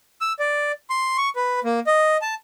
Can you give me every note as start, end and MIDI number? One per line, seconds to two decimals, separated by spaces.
0.21 0.33 88
0.39 0.72 74
0.90 1.17 84
1.17 1.29 85
1.36 1.60 71
1.64 1.80 58
1.87 2.17 75
2.22 2.35 81